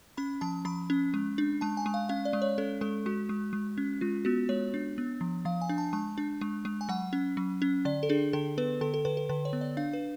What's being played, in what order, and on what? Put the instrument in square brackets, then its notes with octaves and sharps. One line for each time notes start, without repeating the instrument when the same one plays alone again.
[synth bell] C#4 B5
F3 A5
F3 B5
C#4
G#3
D4
G#3 A5
G#5
G#3
F5
C#4 F5
D5
G#3
C#5
C#4 A4
G#3 A4
G#3 F#4
G#3
G#3
C#4
G#3 F4
B3 F#4
G#3 C#5
D4
B3
F3
F3 F5
G#5
D4
A5
G#3 A5
D4
G#3
G#3
G#5
F#3 F#5
C#4
F#3
C#4
D3 D5
A4
D4 G#4
D3 A4
B3 B4
D3 A4
A4
D3 B4
A4
D3 B4
C#5
B3
D5
D4 F5
B4